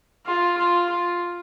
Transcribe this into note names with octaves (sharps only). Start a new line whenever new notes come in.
F4
F4
F4